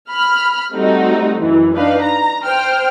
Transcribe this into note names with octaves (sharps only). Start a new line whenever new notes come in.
B5 F6
G3 A3 C4 D#4 F#4
F#2 E3
D4 D#4 B4 F5
A#5
C5 G5 F6